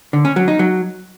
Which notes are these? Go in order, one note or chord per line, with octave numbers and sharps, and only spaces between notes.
D3
C#4
F#3
D#4
F#3